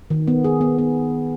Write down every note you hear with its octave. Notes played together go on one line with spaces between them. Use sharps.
D#3
B3
G#4
B3
B3